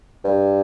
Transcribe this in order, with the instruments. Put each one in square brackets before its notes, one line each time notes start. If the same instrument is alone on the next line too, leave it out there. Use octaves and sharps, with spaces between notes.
[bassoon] G2